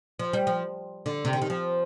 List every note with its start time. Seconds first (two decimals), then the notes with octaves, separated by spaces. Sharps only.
0.19 F3
0.33 G3
0.47 F3
1.06 D3
1.25 C3
1.33 D3
1.42 D#3
1.50 F3